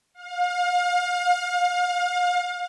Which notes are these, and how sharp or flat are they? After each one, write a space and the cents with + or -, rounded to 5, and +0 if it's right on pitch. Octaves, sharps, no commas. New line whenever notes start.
F5 +35